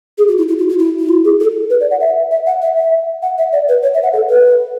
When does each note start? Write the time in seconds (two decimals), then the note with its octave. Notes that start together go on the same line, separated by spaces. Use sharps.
0.18 G#4
0.28 F#4
0.38 E4
0.48 E4
0.59 F#4
0.69 F#4
0.79 E4
0.99 E4
1.09 F#4
1.24 G#4
1.40 A4
1.70 B4
1.81 D5
1.91 F#5
2.00 E5
2.31 E5
2.47 F#5
2.62 E5
2.77 E5
3.22 F#5
3.38 E5
3.53 D5
3.69 B4
3.83 C#5
3.94 E5
4.03 F#5
4.13 A4
4.29 B4